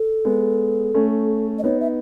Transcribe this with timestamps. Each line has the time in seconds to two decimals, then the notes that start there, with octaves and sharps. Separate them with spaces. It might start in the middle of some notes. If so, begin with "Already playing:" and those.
Already playing: A4
0.25 G#3 B3
0.94 A3 C#4
1.59 D#5
1.64 B3 D#4 C#5
1.80 E5